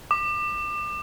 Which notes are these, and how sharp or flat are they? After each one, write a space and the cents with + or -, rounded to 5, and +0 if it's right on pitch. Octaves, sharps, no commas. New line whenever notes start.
D6 +35